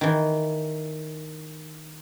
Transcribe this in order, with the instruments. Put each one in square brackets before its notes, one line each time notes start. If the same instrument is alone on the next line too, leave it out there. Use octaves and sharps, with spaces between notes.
[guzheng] D#3 E3